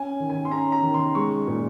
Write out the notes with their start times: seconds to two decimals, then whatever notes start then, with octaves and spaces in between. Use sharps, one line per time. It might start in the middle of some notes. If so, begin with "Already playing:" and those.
Already playing: C#4 G#5
0.20 D#3
0.30 G#5
0.45 C6
0.51 C#4 A#5
0.72 A#5
0.83 D#3
0.94 C6
1.15 G#3 C#6
1.47 A#2